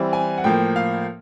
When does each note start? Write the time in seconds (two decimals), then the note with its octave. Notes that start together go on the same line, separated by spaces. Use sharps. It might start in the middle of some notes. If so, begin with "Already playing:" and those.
Already playing: E3 G3 C4
0.13 G#5
0.38 F#5
0.44 A2 F3 A#3 G5
0.76 F5